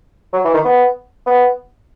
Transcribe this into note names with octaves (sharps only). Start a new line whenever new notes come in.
F#3
E3
D#3
B3
B3